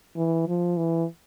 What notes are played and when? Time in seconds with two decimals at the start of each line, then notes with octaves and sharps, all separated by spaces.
0.16 E3
0.48 F3
0.77 E3